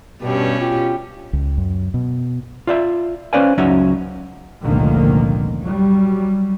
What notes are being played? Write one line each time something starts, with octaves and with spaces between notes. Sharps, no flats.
G2 B2 C#4 G4
F4 G4
C#2
F#2
B2
F4 D5 E5
C#4 B4 C5 D5 F5 G#5
C#2 F#3 C#4 D#4 F#4 E5
F1 C#2 A#2 D3 D#3 A#3
F#3 G3